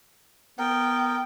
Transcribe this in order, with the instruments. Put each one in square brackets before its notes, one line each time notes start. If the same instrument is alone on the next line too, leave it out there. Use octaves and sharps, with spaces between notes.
[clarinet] B3 [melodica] A#4 [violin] G5